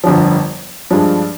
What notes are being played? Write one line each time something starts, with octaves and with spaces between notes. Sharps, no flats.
G1 F2 D3 F3
G2 F3 G#3 D4